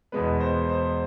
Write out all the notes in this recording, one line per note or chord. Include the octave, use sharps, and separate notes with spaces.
E2 B2 G#3 B3 B4
C5
C5